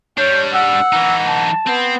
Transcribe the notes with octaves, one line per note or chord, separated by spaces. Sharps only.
G3 D4 C#5 G6
F#5 E6
E3 D#4
A5
B3 C4